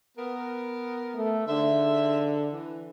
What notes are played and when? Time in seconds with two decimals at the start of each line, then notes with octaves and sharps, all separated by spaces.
0.18 B3 A#4
1.16 A3
1.48 G#2 D3 C5 E5
2.52 E3